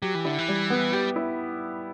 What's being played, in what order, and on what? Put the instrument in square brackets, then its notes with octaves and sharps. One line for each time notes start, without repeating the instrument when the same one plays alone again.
[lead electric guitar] F#3 [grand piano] G4
[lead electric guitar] E3
[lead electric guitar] D3 [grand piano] E4
[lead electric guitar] E3
[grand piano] G3
B3
[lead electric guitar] G3 [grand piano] G4
[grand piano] E4